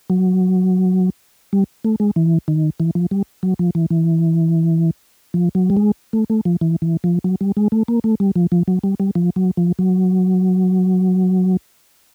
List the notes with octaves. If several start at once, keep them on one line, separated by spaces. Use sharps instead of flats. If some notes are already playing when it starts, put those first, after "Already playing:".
F#3
G3
A3
G#3
E3
D#3
E3
F3
G3
F#3
F3
E3
E3
F3
F#3
G3
G#3
A3
A3
F3
E3
E3
F3
F#3
G3
G#3
A3
A#3
A3
G3
F3
F3
F#3
G3
G3
F3
F#3
F3
F#3